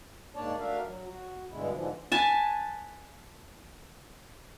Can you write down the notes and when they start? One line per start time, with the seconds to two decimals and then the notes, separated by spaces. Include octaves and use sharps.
0.36 G#2 A#3 D4 C#5 D5 A5
0.59 A3 D4 F#4 A#4 E5 F5
0.86 F#3
1.07 F#4
1.50 G2 B2 D3 G#3 E4
1.72 G#2 D3 E3 F3
2.12 B4 G#5 A5